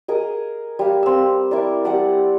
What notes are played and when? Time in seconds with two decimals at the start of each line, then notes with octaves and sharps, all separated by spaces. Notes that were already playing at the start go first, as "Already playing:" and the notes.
0.08 G#4 A#4 D#5
0.79 G3 F5
1.03 C4 E6
1.51 E4 A#4 D5
1.84 G3 D5 F#5 A5